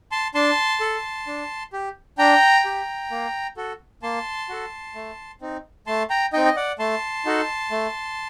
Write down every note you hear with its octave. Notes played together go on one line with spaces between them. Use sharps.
A5 C6
D4 A5 C6
A4
D4
G4
D4 G5 A#5
G4
A#3
F#4 A4
A#3 A5 C6
F#4 A4
A3
C4 D#4
A3 A5 C6
G5 A#5
C4 D#4 D#5 G5
D#5
D5 F#5
A3 A5 C6
D#4 F#4 A4
A3